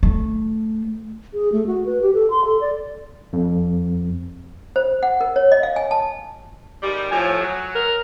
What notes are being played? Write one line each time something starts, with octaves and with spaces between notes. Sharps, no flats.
A3
G#4
A3
F#4
B4
G4
A4
C6
A4
D5
F2
C5
F#5
A#4
C#5
D#5
F5
G#5
A5
G#2 D#3 G3
A2 F3 G#5
F#3
A#4